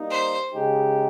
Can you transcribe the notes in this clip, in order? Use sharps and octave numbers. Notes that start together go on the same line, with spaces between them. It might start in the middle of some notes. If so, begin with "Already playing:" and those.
Already playing: G3 A#3 D#4
C5
C#3 G#3 D#4 G4